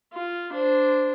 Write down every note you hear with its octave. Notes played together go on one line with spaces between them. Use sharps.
F4
D4 C5